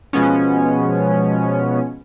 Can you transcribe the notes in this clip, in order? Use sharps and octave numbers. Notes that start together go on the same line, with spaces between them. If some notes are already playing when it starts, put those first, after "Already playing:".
B2 F3 G#3 B3 C#4